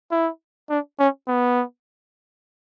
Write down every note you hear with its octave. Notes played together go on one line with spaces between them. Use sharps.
E4
D4
C#4
B3